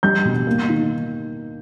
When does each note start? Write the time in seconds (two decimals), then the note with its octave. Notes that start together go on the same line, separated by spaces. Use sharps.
0.03 G3 G6
0.25 B2
0.47 A#3
0.69 D#3